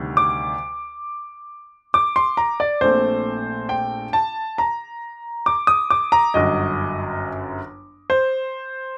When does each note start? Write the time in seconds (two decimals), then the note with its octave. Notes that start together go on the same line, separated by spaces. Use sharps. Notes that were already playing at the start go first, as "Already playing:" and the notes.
Already playing: D2 C3 D#3 G3
0.17 D6
1.94 D6
2.16 C6
2.37 A#5
2.60 D5
2.81 A#1 A#2 A3 C4 C5
3.69 G5
4.13 A5
4.58 A#5
5.46 D6
5.67 D#6
5.90 D6
6.12 A#5
6.34 G1 F#2 F#3 D#5
8.10 C5